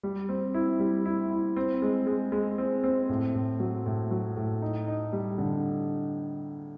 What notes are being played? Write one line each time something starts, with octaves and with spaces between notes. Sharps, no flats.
G3
C4
E4
G3
E4
E4
C4
G#3
G#3
G#3
C4
C4
A2
A2
F#3
A2
F#3
A2
D#4
D#4
G3
D3